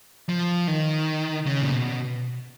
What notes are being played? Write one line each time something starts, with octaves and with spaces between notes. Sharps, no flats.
F3
D#3
C#3
A#2
B2